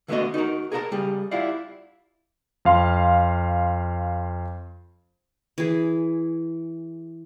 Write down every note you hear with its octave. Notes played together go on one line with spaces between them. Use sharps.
D3 A3 B3 D4 F#4 D#5
D#4 F#4 G#4 A#4
G#4 A#4 C#5 F#5 A5 A#5
C#3 G3 G#4
E4 F4 G4 D5 F5 F#5
F2 F5 C6
E3 G#4